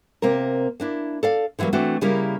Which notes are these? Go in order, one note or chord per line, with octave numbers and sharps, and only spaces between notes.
C3 A#3 C4 A#4
A#3 D4 E4
A4 D5 F5
D3 E3 F#3 G3 A#3
E3 A3 C4 D4 F#4
C#3 G3 A#3 E4 A#4